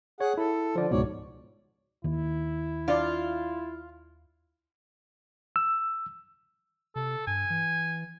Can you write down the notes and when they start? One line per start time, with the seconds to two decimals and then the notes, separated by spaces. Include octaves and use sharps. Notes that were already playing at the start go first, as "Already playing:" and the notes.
0.21 G#4 C#5 F#5
0.38 E4 A4
0.76 D3 F3 D5
0.91 C#2 G#2 B2 C#5 D5
2.04 D#2 D#3 E4
2.88 D4 F4 D5
5.56 E6
6.96 C3 A4
7.27 G2 G#5
7.50 E3